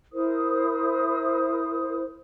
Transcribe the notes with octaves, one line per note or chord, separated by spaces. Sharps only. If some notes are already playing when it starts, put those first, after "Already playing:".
E4 A#4 C5 D#6